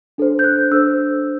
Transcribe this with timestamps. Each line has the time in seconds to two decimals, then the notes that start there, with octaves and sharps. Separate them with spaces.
0.18 D4 A4 C5
0.39 G6
0.44 F#6
0.71 D4 A4 C5 E6